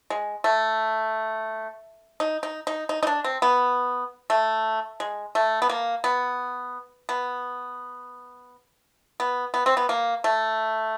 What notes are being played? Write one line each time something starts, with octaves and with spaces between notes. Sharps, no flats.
G#3
A3
D#4
D#4
D#4
D#4
D#4
D4
C4
B3
A3
G#3
A3
B3
A#3
B3
B3
B3
B3
C4
B3
A#3
A3